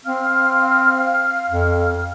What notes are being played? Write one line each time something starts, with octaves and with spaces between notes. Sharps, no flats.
C4 F5 F6
F2